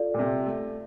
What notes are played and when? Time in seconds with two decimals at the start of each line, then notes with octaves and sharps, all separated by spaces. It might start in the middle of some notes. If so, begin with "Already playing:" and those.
Already playing: F4 A4 D5 F5
0.14 A#2
0.19 C3
0.46 A3